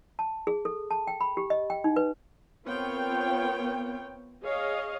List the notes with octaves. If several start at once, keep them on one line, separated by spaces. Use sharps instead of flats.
A5
G#4
A4
A5
G5
B5
G4
D#5
G5
D#4
B4
B3 C4 F4 A#4 C#5 G5
G#4 C#5 D#5 F5